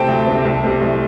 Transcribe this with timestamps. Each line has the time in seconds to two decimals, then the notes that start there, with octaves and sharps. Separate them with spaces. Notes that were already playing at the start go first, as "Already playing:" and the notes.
Already playing: C3 A3 C4 G5 A5
0.08 D2
0.27 C3 A3 C4
0.45 C2
0.63 C3 A3 C4
0.81 C2